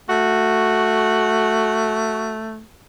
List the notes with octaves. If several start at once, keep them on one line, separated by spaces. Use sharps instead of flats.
A3 F#4